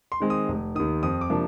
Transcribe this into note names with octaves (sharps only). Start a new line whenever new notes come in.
C6
D#3 G#3 C4
D#6
F1
D#2 D#3 D#6
F2 D#6
D6
C3 F3 A#3 D4